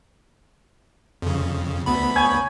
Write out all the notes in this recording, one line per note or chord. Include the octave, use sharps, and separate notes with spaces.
F2 C#3
D2 B3 B5
C#5 G5 G#5